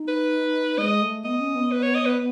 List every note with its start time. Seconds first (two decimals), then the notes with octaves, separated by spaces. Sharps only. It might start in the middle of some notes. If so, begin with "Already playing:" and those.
Already playing: D#4
0.08 B4
0.78 G#3 D#5
1.02 A3
1.24 B3 D#5
1.40 C#4
1.55 B3
1.72 B4
1.83 C#5
1.95 D#5
2.05 B4